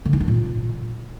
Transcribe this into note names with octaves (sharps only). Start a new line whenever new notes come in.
D3
D#4
D4
A#2